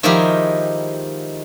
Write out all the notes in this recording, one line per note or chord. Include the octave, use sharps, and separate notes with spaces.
D#3 F3 G#3 E4 G4 A#4